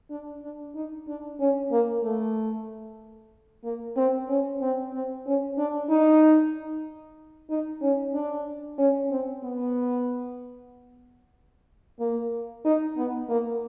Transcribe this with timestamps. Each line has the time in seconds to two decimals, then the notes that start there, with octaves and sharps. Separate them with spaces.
0.10 D4
0.43 D4
0.75 D#4
1.08 D4
1.40 C#4
1.71 A#3
2.03 A3
3.64 A#3
3.97 C4
4.28 C#4
4.61 C4
4.93 C4
5.26 C#4
5.58 D4
5.90 D#4
7.50 D#4
7.82 C#4
8.14 D4
8.78 C#4
9.10 C4
9.43 B3
12.00 A#3
12.65 D#4
12.97 B3
13.29 A#3